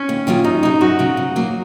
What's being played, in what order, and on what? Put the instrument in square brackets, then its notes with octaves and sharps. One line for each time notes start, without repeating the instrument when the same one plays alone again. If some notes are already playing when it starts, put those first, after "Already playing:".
Already playing: [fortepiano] C#4
[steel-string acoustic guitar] D#2
D#3 F#3 A#3 F4
[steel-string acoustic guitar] F#2 [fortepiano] D#4
[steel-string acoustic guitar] C#3 F#3 [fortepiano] D#4
[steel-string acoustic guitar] F#2 [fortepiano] F#4
[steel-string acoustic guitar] C#3 F#3
C#3
F#3 A#3